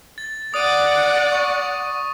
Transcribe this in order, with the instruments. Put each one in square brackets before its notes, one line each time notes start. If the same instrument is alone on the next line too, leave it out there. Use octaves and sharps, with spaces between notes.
[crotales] A6
[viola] D5 F#5 [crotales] D#6 D#7
[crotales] C#6